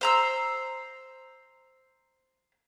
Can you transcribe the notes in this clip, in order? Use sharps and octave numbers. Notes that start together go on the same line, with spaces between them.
C5 A#5 E6